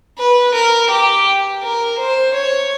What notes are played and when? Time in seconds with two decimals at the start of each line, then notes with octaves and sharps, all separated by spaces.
0.18 B4
0.55 A#4
0.91 G4
1.63 A#4
1.99 C5
2.35 C#5